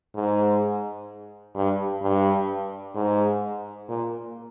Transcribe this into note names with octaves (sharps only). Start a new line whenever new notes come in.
G#2
G2
G2
G#2
A#2